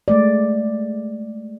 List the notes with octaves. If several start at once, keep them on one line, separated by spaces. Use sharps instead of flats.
G#3 A3 D5